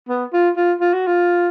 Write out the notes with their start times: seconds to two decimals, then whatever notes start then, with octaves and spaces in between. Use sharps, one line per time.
0.09 B3
0.33 F4
0.56 F4
0.81 F4
0.94 F#4
1.07 F4